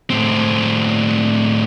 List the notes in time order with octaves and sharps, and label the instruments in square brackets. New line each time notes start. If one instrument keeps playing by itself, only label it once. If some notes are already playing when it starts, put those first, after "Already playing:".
[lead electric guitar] A2 C4